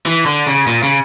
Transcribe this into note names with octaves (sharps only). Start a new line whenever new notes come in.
E3
D3
C#3
A#2
C#3